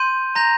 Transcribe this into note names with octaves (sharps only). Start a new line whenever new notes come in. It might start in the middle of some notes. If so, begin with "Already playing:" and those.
Already playing: C6 G6 D#7
A#5 G6 A#6 F7